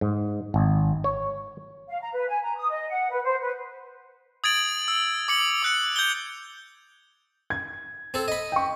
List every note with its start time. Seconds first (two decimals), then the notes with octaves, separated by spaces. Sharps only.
0.01 G#2
0.54 G#1
1.04 C#5
1.89 F5
2.01 A#5
2.13 B4
2.28 G#5
2.42 A#5
2.56 D#6
2.69 D#5
2.89 F#5
3.10 B4
3.24 C5
3.41 B4
4.44 D#6 G#6 A6 D7 F#7
4.88 E6
5.28 D6 C#7 F#7
5.62 D6 F#6 C#7
5.96 G6 G7
7.50 G#6
8.14 C4 A4
8.28 D#5 B5
8.52 G5 C#6